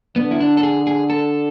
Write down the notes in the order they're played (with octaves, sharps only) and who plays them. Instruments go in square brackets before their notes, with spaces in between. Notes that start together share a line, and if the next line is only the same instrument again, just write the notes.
[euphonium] D3 [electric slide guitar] B3
[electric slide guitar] E4
D4
A4
G#4
G#4
A4